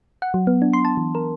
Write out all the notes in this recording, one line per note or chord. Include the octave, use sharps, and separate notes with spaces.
F#5
F#3
B3
D4
C6
A5
E3
A#4